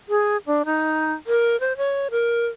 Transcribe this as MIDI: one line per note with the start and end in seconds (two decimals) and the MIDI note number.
0.09 0.37 68
0.47 0.62 62
0.65 1.13 63
1.27 1.59 70
1.60 1.76 72
1.77 2.08 73
2.11 2.47 70